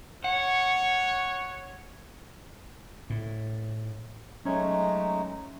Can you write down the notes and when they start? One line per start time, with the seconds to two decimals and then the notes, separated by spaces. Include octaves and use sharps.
0.24 C#5 F#5
3.10 A2
4.45 F#3 G#3 A3 C#4 D#4 C#5